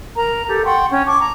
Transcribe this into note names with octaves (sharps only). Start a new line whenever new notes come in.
A#4 A#5
G4 A4
F#5 G5 C6 C#6
C#4 G5
A5 C#6 D6
A#5